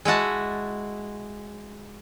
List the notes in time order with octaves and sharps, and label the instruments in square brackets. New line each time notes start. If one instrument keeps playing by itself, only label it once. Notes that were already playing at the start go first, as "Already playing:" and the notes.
[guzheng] G#3 E4 F#4 A5